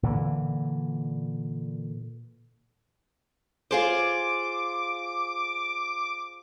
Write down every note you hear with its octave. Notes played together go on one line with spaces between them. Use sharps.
A#2 D3 E3
F4 G#4 C5 D6